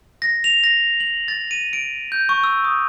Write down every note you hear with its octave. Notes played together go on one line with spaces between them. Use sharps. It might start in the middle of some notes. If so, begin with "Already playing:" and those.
A#6
F7
A#6
F#7
A6
D#7
D7
G6
C#6
E6
D#6